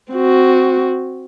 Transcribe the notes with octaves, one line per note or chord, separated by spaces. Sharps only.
C4 F#4